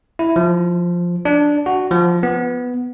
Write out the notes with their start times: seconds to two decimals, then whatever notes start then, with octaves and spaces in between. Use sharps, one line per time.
0.19 E4
0.36 F3
1.25 D4
1.66 F#4
1.91 F3
2.23 B3